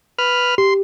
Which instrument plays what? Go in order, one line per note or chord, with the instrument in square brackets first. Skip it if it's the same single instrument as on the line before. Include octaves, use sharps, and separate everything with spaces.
[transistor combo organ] B4 F6
[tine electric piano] G4 [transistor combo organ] C6